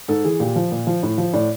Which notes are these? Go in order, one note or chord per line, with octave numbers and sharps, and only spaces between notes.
G#2 A4
E3 G#4
A#2 G4
F3
A#2
F3
A2
F3
A2 D5